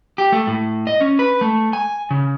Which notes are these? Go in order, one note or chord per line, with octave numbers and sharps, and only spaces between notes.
G4
A3
A2
D#5
C#4
B4
A3
G#5
C#3